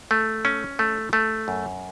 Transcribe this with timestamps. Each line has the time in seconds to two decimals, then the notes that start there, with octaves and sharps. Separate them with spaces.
0.11 A3
0.45 C#4
0.79 A3
1.13 A3
1.48 F#2